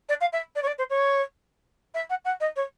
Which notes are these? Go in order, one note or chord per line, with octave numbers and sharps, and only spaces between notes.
D5
F5
E5
D5
C#5
D5
C5
C#5
E5
F#5
F#5
D#5
C#5